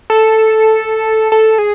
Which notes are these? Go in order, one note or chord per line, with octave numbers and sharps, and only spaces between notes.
A4
A4
G#4